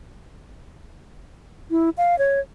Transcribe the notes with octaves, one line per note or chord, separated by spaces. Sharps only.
E4
F5
C#5